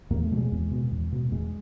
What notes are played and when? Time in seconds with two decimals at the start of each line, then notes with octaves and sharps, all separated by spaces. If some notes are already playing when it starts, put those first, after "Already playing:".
0.10 E2 A#3
0.24 A3
0.31 B2 G3
0.37 G#3
0.52 E2
0.71 B2
0.91 E2
1.12 B2
1.32 E2 G#3